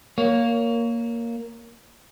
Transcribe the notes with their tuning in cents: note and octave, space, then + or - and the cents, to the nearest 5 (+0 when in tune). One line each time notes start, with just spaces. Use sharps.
A#3 +0 C#5 +25